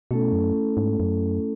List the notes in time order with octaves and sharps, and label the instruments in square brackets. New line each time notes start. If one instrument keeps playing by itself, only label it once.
[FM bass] B2 [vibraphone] A3 C#4 E4 A4
[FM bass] F#2
G#2
F#2